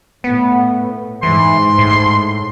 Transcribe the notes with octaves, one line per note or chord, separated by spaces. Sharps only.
A2 B3
G#2 E3 C6
A2